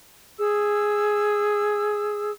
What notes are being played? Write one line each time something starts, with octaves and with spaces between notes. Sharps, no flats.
G#4 E6